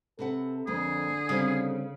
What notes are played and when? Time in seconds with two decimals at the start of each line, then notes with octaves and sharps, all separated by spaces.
0.19 C3 A4 B4 F#5
0.67 F2 D3 A#3 G#4 B4
1.29 C#3 G3 C4